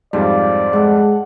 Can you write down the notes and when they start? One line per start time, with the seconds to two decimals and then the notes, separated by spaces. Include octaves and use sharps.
0.13 F2 G#2 F3 G3 D5
0.73 G#3 A4 F#5